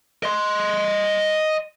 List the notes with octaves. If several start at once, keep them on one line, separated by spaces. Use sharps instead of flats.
D#5 C6